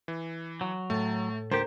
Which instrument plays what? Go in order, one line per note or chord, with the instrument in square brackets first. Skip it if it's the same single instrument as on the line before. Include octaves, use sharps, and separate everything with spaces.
[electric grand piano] E3
[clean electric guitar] F#3
[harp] A2 A6 [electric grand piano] A3
[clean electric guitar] D2 G4 [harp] A#3 [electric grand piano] C5